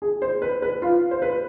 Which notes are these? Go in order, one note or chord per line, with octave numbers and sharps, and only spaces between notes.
G#4
C5
B4
B4
F4
C5
B4